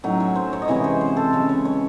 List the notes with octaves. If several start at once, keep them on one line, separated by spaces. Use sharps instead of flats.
A2 F#3 C#4 D#4
C#5
C5
C#5
D#5
C3 E3 G#3 C#4 C#5
C5
C5
A4
C#3 G#3 C#4
C#5
C#5